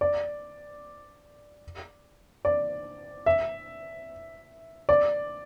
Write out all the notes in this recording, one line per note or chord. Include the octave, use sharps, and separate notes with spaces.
D5
D5
E5
D5